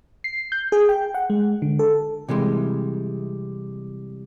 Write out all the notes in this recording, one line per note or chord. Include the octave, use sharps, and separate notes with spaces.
C7
G6
G#4
G5
F#5
G#3
D3
A4
C3 E3 G3 G#3